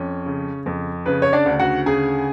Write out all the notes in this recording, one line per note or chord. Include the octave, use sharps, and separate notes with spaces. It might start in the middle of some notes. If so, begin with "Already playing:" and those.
Already playing: F2 C#4
C#3
F2
C#3 B4
C#5
D4 D5
D2
F#4 F#5
C#3 G#4 G#5